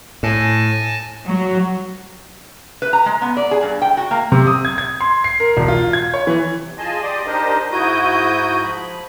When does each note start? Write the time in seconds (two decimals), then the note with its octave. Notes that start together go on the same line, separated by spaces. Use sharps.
0.23 A2 G#5 A5 A#6
1.27 F#3
2.82 B4
2.93 A#5
3.06 G#3
3.22 B3
3.37 D5
3.51 G#4
3.62 G2
3.82 G5
3.97 F#4
4.11 A#3
4.32 C3
4.47 D#6
4.65 G#6
4.78 G#6
5.01 C6
5.24 C7
5.40 A#4
5.57 E1
5.68 F4
5.93 G#6
6.14 C#5
6.27 E3
6.52 C3
6.78 F4 G#4 D#5 G#5 A5 C6
7.02 G4 D5 D#5 C6 D6 D#6
7.27 D4 D#4 G4 A#4 C5 D#5
7.71 G#2 E4 F#4 D#6 G6
8.64 F3 B5